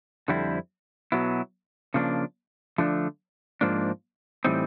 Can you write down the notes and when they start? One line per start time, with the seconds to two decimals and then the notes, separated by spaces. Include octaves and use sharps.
0.28 F2 D3 G3 C4 E4
1.12 B2 F#3 B3 E4
1.94 C#3 F3 A#3 D4
2.78 D3 F3 A3 D4
3.61 G#2 F3 A#3 D4
4.45 A2 E3 G3 C4 D#4